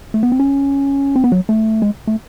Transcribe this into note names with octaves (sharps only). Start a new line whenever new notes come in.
A3
B3
C4
C#4
C4
B3
F#3
A3
G#3
A3